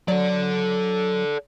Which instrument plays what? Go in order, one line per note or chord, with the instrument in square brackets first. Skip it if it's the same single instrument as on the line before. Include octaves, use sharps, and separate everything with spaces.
[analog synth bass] F#3 [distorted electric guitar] A4 D5